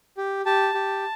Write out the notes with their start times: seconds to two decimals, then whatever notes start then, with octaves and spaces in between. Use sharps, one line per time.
0.17 G4
0.45 G4 A5
0.74 G4